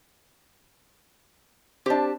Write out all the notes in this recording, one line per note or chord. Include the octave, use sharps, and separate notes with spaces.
C4 D4 G4 A5